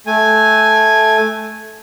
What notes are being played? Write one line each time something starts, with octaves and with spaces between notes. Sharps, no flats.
A3 G#5